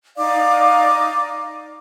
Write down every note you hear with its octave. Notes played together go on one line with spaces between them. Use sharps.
D#4 D5 F5 D6